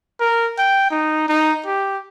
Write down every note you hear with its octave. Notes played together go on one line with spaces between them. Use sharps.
A#4
G5
D#4
D#4
G4